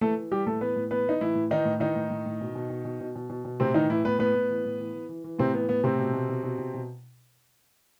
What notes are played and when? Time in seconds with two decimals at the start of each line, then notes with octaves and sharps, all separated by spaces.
0.01 E3 A3 A4
0.17 E3
0.31 E3 G3 G4
0.46 A2 A3 A4
0.61 E3 B3 B4
0.76 A2
0.91 E3 B3 B4
1.06 E3 D#4
1.21 A2 E3 E4
1.35 A2
1.51 D#3 E3 D#4
1.65 A2
1.80 D#3 E3 D#4
1.96 A2
2.11 A2
2.26 A2
2.41 B2
2.55 B2
2.70 B2
2.85 B2
3.01 B2
3.16 B2
3.30 B2
3.45 B2
3.60 A2 C3 C4
3.74 D#3 E3 D#4
3.89 A2 E3 E4
4.05 A2 B3 B4
4.19 A2 B3 B4
4.35 A2
4.50 E3
4.65 A2
4.79 E3
4.95 E3
5.09 E3
5.24 E3
5.39 A2 C3 C4
5.54 E3 B3
5.69 A2 B3
5.84 A2 C3 C4
5.99 B2
6.14 B2
6.29 B2
6.44 B2
6.59 B2
6.74 B2